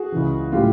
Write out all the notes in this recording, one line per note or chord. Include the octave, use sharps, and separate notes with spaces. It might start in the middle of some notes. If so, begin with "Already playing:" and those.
Already playing: F#4 G#4
C#2 C#3 E3
A2 F#3 A3 F4 G4